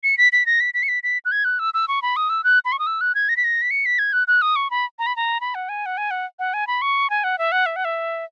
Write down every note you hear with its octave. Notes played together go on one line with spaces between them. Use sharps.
C#7
B6
B6
A#6
B6
B6
C#7
B6
B6
F#6
G#6
F#6
E6
E6
C#6
B5
D#6
E6
F#6
B5
C#6
D#6
E6
F#6
G#6
A#6
B6
A#6
B6
C#7
B6
G#6
F#6
F#6
D#6
C#6
B5
A#5
B5
A#5
B5
F#5
G#5
F#5
G#5
F#5
F#5
G#5
B5
C#6
G#5
F#5
E5
F#5
E5
F#5
E5